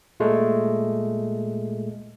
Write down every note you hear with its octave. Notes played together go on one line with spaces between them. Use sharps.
A#2 G#3 A3